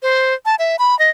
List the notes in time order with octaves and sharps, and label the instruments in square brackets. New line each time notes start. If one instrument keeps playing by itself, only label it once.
[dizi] C5
A5
E5
B5
D#5